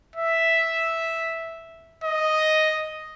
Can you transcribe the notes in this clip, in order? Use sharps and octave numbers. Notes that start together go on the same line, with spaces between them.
E5
D#5